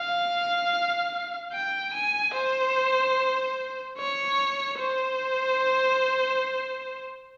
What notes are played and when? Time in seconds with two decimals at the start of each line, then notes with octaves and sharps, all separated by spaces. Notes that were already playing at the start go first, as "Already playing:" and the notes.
Already playing: F5
1.53 G5
1.94 G#5
2.35 C5
3.98 C#5
4.79 C5